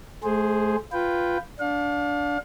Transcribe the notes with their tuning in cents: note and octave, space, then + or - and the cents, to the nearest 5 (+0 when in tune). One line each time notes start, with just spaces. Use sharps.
A3 -35 G#4 +0 C5 +0
F4 +0 B4 +0 G5 +0
D4 -15 F5 +35